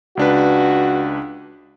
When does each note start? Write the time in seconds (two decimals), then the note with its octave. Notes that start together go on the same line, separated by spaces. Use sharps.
0.17 C#2 D4 F#4 B4